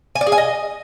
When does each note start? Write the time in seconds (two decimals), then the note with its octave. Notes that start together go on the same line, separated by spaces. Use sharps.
0.15 G#5
0.21 D5
0.27 G#4
0.32 G#5
0.38 D#5